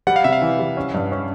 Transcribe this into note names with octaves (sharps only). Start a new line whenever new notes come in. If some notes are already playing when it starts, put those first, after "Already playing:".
G3 F#5
F5
C3 E5
F5
E3
G3
C#4
G2
C#4